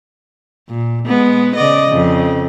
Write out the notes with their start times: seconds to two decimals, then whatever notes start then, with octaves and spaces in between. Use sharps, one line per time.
0.69 A#2
1.06 G#3 B3
1.56 C#3 D5 D#5
1.91 F2 C#3